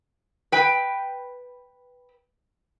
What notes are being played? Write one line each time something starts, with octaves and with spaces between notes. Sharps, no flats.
B4 G5